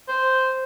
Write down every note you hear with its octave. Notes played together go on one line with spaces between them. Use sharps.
C5